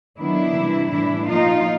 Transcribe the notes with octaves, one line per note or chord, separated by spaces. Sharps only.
D#3 F#3 B3 D4 E4
C3 E3 G3
A2 E3 G3 D4 E4
A#2 F3 A#3 D#4 F4